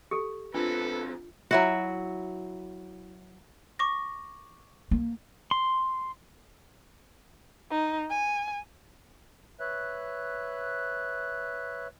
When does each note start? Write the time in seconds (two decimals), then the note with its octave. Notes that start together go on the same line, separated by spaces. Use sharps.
0.11 G4 A4
0.54 E2 A3 C4 D4 F4 A4 B4
1.51 F#3 E4 F#4
3.79 C#6 D6 A#6
4.91 A#3
5.51 C6
7.71 D#4
8.10 G#5
9.60 B4 C#5 E5 F#6